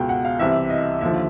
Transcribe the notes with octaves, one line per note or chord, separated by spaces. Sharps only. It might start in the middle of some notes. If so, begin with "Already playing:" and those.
Already playing: C#2 B2 G5
F#5
F5
C2 C3 E3 E5
D#5
D#2 D3 F3 E5